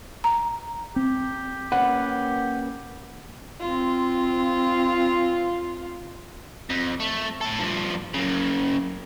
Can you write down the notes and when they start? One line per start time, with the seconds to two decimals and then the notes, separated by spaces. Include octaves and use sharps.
0.24 A#5
0.96 C4 G4
1.72 A#3 C#4 B4 F#5
3.60 C4 F4
6.70 F2
7.00 A3
7.41 A2 A4
7.59 G2 F3
8.14 F#2 C#3